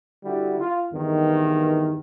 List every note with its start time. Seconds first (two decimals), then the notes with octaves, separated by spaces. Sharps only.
0.24 D3 G3 E4 F#4
0.59 F4
0.92 E2 G2 D#3